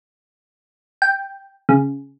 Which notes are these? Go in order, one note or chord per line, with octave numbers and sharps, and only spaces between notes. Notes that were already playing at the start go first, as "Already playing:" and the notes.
G5
C#3